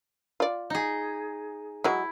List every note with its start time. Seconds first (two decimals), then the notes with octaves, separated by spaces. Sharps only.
0.40 F4 D5
0.70 D#4 G#4
1.84 F#3 G#3 E4